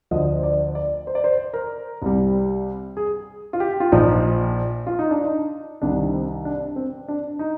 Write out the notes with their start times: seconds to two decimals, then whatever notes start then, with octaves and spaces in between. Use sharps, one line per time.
0.11 D2 D3 F3 D#5
0.39 C5
0.43 D5
0.75 D5
1.07 C5
1.15 D5
1.24 C5
1.54 A#4
2.02 C2 C3 G3
2.97 G#4
3.53 F4
3.60 G4
3.80 F4
3.92 A#1 A#2 F3 D#4
4.87 F4
4.99 D#4
5.11 D4
5.24 D#4
5.82 C2 C3 D#3 D4
6.14 C4
6.45 D4
6.76 C4
7.08 D4
7.39 D#4